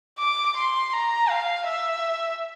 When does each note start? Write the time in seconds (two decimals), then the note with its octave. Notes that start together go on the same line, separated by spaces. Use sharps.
0.19 D6
0.57 C6
0.93 A#5
1.30 F5
1.66 E5